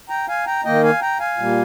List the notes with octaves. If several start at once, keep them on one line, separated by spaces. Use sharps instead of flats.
G5 A#5
F5 G#5
G5 A#5
D#3 A#3 D#5 G5
F5 G#5
G5 A#5
F5 G#5
A#2 G3 A#3